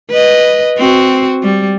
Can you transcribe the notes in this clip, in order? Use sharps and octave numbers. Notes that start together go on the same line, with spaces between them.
B4 D#5
C4 F#4
G3